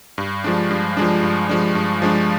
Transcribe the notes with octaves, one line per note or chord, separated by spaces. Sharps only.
G2
F3 G#3 D4
G2
F3 G#3 D4
G2
F3 G#3 D4
G2
F3 G#3 D4